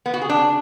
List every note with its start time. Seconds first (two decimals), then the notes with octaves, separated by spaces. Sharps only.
0.06 B3
0.14 F#4
0.22 G#4
0.29 D4